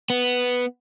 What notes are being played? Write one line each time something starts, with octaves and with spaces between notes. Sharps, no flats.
B3